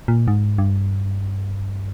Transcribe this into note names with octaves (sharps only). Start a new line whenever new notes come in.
A#2
G#2
G2